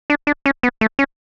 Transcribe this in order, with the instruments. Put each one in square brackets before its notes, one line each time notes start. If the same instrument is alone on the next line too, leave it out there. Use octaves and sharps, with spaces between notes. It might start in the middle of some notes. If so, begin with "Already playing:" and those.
[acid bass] D4
D4
C#4
B3
A3
C#4